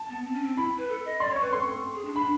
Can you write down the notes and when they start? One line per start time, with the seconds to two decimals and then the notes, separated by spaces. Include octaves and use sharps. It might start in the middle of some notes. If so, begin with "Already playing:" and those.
Already playing: A5
0.09 B3
0.25 C4
0.34 C#4
0.43 C4
0.57 E4 B5
0.78 B4
0.89 A4
1.05 D#5
1.20 D5 C6
1.31 C#5
1.36 C#6
1.41 B4
1.52 A4 C6
1.95 G#4
2.05 D4
2.16 D4 B5